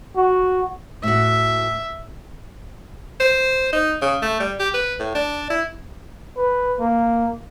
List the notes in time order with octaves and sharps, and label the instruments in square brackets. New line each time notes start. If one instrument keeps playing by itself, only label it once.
[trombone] F#4
[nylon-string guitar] A2 F#4 [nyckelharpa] E5
[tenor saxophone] C5
D#4
C#3
A3
G3
G4
B4
A2
D4
E4
[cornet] B4
A#3